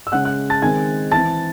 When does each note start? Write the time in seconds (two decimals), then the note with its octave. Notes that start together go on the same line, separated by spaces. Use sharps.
0.07 E6
0.12 C#3 G#3 C#4 F#5 F#6
0.25 F#5 F#6
0.50 A5 A6
0.62 D#3 G#3 C4 G#5 G#6
1.11 E3 C4 A5 A6